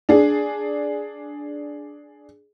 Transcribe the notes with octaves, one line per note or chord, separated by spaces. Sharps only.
D4 G#4